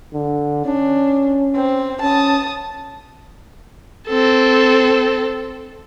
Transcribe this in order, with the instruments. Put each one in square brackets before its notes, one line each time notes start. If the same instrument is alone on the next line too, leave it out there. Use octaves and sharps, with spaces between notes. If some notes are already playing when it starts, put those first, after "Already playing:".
[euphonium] D3
[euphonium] C#4 [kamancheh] D4
[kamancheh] C4
[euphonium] C#4 [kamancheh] A5 D#6
[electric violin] C4 A4